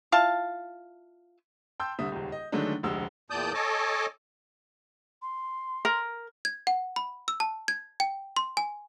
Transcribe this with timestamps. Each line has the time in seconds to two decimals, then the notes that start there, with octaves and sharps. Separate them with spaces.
0.12 E4 F4 F5 A5
1.80 G5 A5 C6 E6 G6
1.99 C2 D3 E5 D#6
2.12 D#1 C#2
2.32 D#5
2.52 D3 D#3 F#3 G#3 A3 D4
2.83 F1 D2 G#3 E6
3.30 E2 A#2 D5 A5 D#6 G6
3.54 A4 C#5 D#5 G#5 A5 D6
5.22 C6
5.85 A#4
6.45 G#6
6.67 F#5
6.96 B5
7.28 E6
7.40 A5
7.68 G#6
8.00 G5
8.36 C6
8.57 G#5